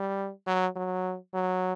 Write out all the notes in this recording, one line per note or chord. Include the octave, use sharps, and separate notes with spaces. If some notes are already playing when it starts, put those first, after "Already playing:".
Already playing: G3
F#3
F#3
F#3